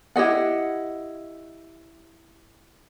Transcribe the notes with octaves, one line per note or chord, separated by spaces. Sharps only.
E4 G4 D#5 F#5